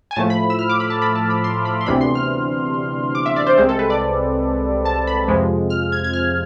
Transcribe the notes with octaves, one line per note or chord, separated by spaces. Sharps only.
G#5
A2 F3 A3 A5
B5
E6
F6
D6
B5
A5
B5
A5
B5
C6
B5
C6
D2 C3 E3 B3 D4 B5
C6
F6
D6
E5
D5
C5
C2 C3 G#3 C4 C5
A4
B4
D5
A5
B5
F2 C3 F3 G#3
F6
G#6
G#6
F6